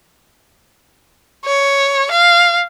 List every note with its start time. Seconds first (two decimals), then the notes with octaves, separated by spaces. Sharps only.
1.45 C#5
2.11 F5